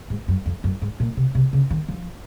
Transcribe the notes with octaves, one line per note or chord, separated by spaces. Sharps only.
G#2
F#2
F2
F#2
G#2
A#2
C3
C3
C#3
D#3
F3